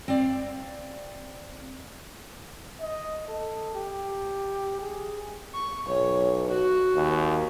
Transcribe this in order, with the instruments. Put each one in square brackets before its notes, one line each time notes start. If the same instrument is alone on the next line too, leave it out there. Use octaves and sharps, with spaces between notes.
[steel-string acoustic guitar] C4 D5 F5
[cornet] D#5
A4
G4
G#4
[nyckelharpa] C#6
[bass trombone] B1 [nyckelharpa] C#5
[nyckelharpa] F#4
[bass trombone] D#2